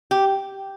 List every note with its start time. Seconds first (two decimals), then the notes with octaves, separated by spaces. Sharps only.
0.11 G4